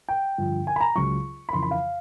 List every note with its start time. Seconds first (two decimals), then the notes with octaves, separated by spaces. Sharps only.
0.08 G5
0.38 G2 D3 F3
0.67 G#5
0.76 B5
0.81 A#5
0.95 C#2 C#3 F#3 C#6
1.49 B5
1.53 F2 C#3 E3 C6
1.63 B5
1.71 F5